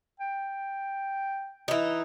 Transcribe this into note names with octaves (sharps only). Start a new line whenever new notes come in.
G5
E3 D#4